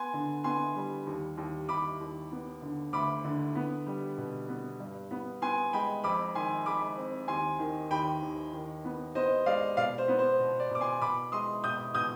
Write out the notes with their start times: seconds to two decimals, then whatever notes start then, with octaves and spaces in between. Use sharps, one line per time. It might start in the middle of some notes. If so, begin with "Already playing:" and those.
Already playing: B3 G#5 C6
0.13 D3
0.44 B3 G#5 C6
0.75 G3
1.07 D#2
1.37 D#2
1.69 D#2 B5 D6
2.01 D#2
2.32 B3
2.62 D3
2.93 D2 B5 D6
3.24 D3
3.55 B3
3.87 G3
4.17 B2
4.49 B3
4.80 G2
5.11 B3
5.42 B3 G#5 C6
5.73 G#3 G5 B5
6.04 F2 B5 D6
6.35 D#3 G#5 C6
6.66 G#3 B5 D6
6.97 C4
7.28 D#2 G#5 C6
7.59 D#3
7.90 D#2 G5 B5
8.21 D#2
8.53 D#3
8.84 B3
9.15 B3 C5 D#5
9.46 G#3 D5 F5
9.77 B2 D5 F5
9.98 C5
10.08 B3
10.19 C5
10.40 B2
10.60 D5
10.70 B2 D6
10.81 G#5 C6
11.01 B2 B5 D6
11.32 G#3 C6 D#6
11.64 B2 D#6 G6
11.94 B2 D#6 G6